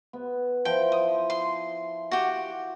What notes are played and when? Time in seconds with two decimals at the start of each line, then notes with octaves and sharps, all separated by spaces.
0.13 B3
0.65 F3 E4 C5 G5
0.92 D#6
1.30 C6
2.11 F#4 G4 F#5